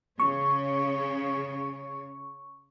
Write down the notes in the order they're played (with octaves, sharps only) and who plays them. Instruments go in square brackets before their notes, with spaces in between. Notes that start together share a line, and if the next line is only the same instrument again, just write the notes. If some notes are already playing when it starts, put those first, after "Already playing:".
[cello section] C#3 C#5 [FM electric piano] C#6